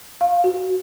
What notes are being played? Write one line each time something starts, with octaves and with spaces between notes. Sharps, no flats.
F5
F#4